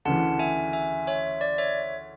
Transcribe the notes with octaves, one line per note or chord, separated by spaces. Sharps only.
D2 C#3 E3 F#5 A5
E5 G#5
E5 G#5
C#5 E5
D5
C#5 E5